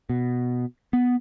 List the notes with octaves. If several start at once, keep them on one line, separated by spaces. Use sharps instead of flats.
B2
B3